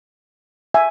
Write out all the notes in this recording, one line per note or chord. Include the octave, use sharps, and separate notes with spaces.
E5 G#5